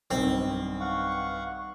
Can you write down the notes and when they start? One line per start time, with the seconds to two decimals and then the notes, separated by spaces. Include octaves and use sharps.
0.11 B1 G2 D#3 C4
0.80 F5 F#5 C#6